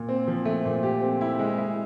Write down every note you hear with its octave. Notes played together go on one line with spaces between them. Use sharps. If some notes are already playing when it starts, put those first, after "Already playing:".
Already playing: A#2
C4
F3
A3
A#2
G4
C4
E4
G#3
E4